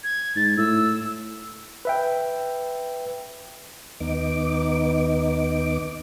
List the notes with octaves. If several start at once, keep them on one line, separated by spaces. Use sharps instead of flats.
G#6
G#2 A6
A2 E6
B4 E5 G5
D#2 B3 D#4 D6